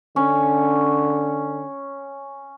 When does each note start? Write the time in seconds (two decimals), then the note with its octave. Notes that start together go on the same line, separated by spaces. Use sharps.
0.16 D3 C#4